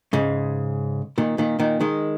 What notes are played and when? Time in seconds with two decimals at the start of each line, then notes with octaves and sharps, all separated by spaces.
0.13 G#2 C#3
1.18 A#2 D#3
1.38 A#2 D#3
1.59 A#2 D#3
1.81 D#3 G#3